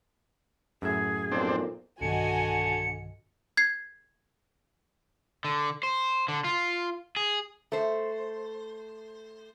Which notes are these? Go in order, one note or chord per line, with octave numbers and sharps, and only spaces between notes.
F#2 A2 G#4 E5
B1 F2 A#2 C4 D4
B1 G2 D3 D#3 F#4 D#5 G#5 C#7
G#6 C7
D3
C5
D3
F4
G#4
A3 C5